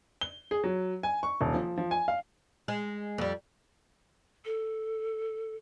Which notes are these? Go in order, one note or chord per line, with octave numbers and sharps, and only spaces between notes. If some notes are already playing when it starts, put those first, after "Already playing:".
G7
G#4
F#3
G#5
C#6
D#1
F3
F3
G#5
F5
G#3
F2 G3
A4